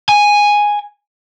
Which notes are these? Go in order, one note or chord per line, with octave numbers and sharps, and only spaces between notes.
G#5